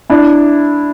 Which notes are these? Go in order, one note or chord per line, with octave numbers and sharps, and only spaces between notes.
D4 E4